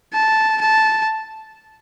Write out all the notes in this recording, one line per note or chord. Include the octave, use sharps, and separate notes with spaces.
A5
A5